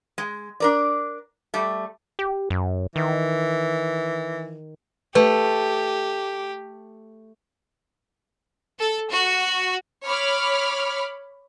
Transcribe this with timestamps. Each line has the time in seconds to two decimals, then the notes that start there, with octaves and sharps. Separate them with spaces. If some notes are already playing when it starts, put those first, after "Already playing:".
0.18 G#3
0.60 D4 A#4 D5
1.54 G3 A3
2.19 G4
2.50 F#2
2.96 D#3 E3
5.15 A3 G4 B4
8.79 A4
9.10 F#4
10.05 C#5 B5 D6 F6